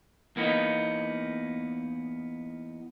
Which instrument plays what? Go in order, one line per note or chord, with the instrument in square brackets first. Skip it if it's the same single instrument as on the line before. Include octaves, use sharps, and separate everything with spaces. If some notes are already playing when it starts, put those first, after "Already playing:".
[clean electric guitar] E2 A#3 B3 D#4